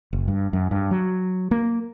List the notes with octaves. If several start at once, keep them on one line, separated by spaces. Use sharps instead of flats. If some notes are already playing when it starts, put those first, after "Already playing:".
F#1
G2
F#2
G2
F#3
A#3